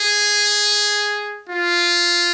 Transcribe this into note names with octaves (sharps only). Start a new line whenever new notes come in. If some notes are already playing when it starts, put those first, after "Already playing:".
Already playing: G#4
F4